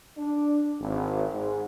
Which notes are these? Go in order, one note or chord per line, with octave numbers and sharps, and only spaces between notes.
D4
G#1
G#2